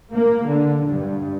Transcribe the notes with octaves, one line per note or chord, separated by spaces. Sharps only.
A#3
D3
G2